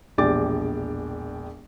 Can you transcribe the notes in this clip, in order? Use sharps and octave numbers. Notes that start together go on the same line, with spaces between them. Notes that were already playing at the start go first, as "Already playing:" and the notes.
E1 A#1 D4 G4 D6 A6